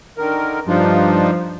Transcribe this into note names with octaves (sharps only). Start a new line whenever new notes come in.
D3 D#3 A#4
G2 F3 D4 D#4 F4